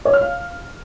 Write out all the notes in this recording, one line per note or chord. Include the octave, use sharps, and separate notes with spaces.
C#5
F6
F5